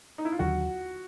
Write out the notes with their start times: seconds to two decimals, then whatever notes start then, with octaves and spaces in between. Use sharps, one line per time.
0.18 D#4
0.25 E4
0.32 F4
0.39 D#2 D3 F#3 F#4